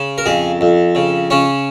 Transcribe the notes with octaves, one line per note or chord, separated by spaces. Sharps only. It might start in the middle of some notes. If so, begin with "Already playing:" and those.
Already playing: C#3
A#4
F2 G#4
F2
C#3
C#3 C#4